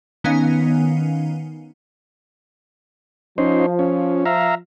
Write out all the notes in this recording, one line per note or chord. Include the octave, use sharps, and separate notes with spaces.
D#3 B3 C#4 D#4 F5 G#5
F3 C#4 D#4 C5
C#4
E5 F5 A#5